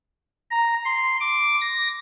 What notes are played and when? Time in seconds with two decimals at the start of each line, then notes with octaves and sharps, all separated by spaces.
0.51 A#5
0.85 C6
1.20 D6
1.61 A#6